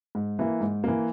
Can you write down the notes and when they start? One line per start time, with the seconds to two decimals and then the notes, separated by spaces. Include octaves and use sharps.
0.15 G#2
0.39 E3 A#3
0.61 G#2
0.84 E3 A#3